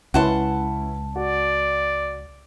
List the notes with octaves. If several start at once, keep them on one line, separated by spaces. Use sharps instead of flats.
C#2 C#4 E4 B4 F#5 A5 C6
F#4 D5